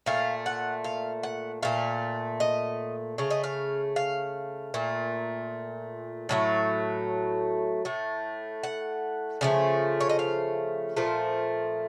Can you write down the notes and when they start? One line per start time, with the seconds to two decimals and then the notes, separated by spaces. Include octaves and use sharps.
0.06 A#2 A3 F5
0.46 F#5
0.84 F5
1.23 F#5
1.63 A#2 A3 F5
2.40 D#5
3.18 C#3 A3 F5
3.31 D#5
3.44 F5
3.96 F5
4.74 A#2 A3
6.29 A2 F#3 A3
7.85 A2 A3
8.63 F#5
9.41 C#3 F3 A3
10.00 C#5
10.09 D#5
10.19 F5
10.97 A#2 F3 A3